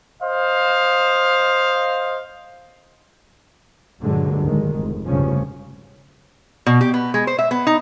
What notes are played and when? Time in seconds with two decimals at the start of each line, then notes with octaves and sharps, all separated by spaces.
0.22 C5 D#5 F5
4.02 G2 A#2 D3 F#3 G#3
4.43 D#2 G#2 D#3 G#3
4.76 F1
5.06 F1 D2 G2 C#3 F3 C#4
6.66 B2
6.81 G4
6.94 B3
7.14 G#3
7.27 C5
7.39 E5
7.51 B3
7.67 D#4